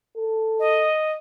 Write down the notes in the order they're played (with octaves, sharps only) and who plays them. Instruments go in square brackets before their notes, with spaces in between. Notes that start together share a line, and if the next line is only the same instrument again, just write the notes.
[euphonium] A4
[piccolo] D#5